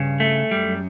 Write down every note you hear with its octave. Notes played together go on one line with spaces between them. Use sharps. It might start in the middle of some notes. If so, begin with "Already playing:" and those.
Already playing: G2 C#3
A3
F#2 G3